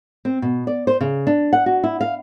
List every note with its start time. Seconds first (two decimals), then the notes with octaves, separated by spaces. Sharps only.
0.25 C4
0.42 B2
0.67 D5
0.87 C5
1.01 C#3
1.27 D4
1.53 F#5
1.66 F#4
1.84 E4
2.01 F5